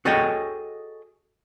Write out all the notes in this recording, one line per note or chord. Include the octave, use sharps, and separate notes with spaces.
F#4 G#4 A4 C#5 D#5 G5